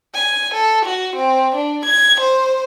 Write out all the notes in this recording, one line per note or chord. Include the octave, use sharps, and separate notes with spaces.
G#5
A4
F#4
C4
D4
G#6
C5